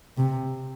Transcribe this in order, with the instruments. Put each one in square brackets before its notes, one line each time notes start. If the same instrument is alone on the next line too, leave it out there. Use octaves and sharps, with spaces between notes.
[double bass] C3